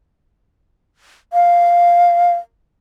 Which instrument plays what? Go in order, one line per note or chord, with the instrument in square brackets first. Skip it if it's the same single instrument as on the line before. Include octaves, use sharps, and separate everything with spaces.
[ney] F5